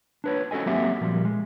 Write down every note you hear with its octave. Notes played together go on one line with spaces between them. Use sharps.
D4 B4 C#5
C#4 F#4 A4 D#5 G#5
F#3 A#3 C4 F#4 G4 E5
A#2 F3 G3
G#3